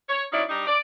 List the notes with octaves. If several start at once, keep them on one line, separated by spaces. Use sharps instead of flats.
C#5
F#3 C#4 D#4 E4 D5
G3 D4 D#4
D5